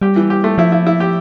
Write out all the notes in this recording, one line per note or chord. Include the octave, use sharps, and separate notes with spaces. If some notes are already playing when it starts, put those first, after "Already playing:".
G3 G4
E3
G4
A3
F3 E4
E4
E4
G4